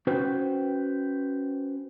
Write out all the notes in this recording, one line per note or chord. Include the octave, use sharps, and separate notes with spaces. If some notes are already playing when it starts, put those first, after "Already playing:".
C#4 F#4 B4 C5 G5